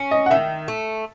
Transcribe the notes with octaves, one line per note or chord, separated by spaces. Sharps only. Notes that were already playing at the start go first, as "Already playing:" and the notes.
Already playing: C#4
D#5
F#5
D#3 E5
A3